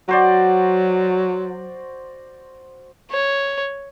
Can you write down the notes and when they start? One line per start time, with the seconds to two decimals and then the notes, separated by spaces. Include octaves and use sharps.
0.09 F#3 F#4 C5 D5
3.11 C#5